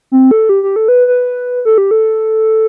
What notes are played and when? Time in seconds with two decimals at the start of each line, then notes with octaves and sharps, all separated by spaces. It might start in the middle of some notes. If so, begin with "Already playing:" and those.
0.12 C4
0.31 A4
0.49 G4
0.63 G4
0.76 A4
0.88 B4
1.07 B4
1.65 A4
1.78 G4
1.91 A4